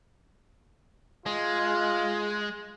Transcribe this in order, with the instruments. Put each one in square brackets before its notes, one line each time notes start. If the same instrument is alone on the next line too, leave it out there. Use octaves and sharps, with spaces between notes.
[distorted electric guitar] G#3 [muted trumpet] F4